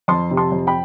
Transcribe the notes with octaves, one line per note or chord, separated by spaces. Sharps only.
F2 A5 C6
C3
A5 C6
F2
G5 B5